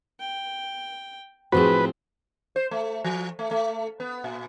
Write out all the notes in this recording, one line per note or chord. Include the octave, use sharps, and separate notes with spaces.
G5
A2 F3 C4 F#4 G#4 B4 C5
C5
A3
F3
A3
A3
B3
A#2